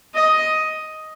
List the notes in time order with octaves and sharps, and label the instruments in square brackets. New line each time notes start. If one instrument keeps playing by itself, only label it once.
[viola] D#5